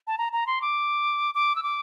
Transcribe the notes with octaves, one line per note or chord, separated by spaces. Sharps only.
A5
A#5
A#5
C6
D6
D6
E6
D6